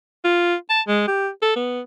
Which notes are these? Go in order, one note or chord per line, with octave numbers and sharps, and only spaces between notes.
F4
A5
G#3
G4
A4
B3